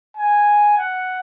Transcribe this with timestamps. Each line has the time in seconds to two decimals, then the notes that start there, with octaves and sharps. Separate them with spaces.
0.17 G#5
0.78 F#5